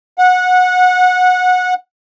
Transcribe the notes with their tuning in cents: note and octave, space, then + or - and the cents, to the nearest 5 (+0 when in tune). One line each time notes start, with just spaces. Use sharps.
F#5 -20